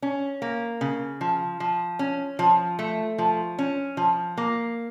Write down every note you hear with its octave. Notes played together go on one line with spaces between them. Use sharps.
C#4
A#3
C#3
F3
F3
C#4
F3
A3
F3
C#4
F3
A#3